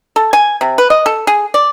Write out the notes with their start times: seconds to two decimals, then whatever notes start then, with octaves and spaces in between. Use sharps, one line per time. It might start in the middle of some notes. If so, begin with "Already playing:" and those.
0.16 A4
0.33 G#5
0.61 C3
0.78 B4
0.90 D#5
1.06 A4
1.27 G#4
1.54 D5